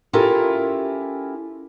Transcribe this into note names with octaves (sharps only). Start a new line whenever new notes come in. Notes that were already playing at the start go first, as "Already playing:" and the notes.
C#4 E4 F4 G4 A4 A#4